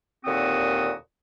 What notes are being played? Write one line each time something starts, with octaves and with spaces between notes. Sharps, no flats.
D#2 A#2 D3 C4 F#4 D#6